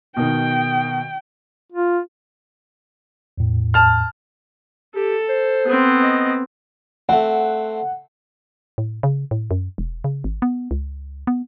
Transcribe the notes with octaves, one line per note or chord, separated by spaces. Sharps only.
B2 D#3 G5
F4
E2 A2
A5 F6
G4 A4
C5
B3 C4
D#5
A3 C4 F#5
A2
C#3
A2
F#2
E1
C#3
G#1
B3
C#2
B3